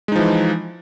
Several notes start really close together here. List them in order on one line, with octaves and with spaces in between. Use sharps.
G#3 D#4 F3 E3